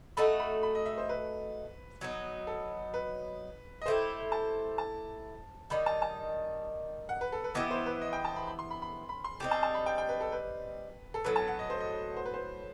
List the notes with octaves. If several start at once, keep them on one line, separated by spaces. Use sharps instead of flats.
A3 D#4 F#4 B5
B5
B5
D#5
E5
C5
B4
F#3 B3 D#4
A4
B4
D#5
A3 E4 G4 C5
A5
A5
D#3 G3 D#4 B5
A5
A5
F#5
B4
A4
B4
E3 B3 E4 G4 D#5
C5
B4
D#5
G5
A5
B5
B5
C6
B5
B5
B5
C6
G3 C4 D#4
A5
A5
B5
G5
G5
B4
A4
B4
A4
A2 F#3 B3 B4
A5
F#5
D#5
C5
D#5
C5
B4
C5